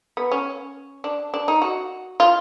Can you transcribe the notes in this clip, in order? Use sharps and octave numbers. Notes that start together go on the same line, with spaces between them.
B3
C#4
D4
D4
D#4
F#4
F4